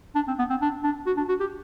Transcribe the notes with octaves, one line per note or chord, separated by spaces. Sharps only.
D4
C4
B3
C4
D4
D4
F#4
D4
F#4
G4